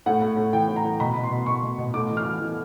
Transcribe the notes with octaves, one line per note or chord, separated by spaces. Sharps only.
A2 F#5
A2
A2
E3 G5
A2
A#5
E3
B2 B5
B2
C6
B2
B2 C#6
B2
B2
A2 D6
E3
F6
E3
E3